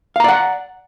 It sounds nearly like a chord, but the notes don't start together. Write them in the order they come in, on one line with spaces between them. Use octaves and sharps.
F5 A#5 D5 F#5